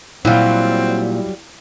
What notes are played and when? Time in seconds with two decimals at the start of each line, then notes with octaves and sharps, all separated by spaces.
0.25 A#2 F#3 G3 C4 E4 F5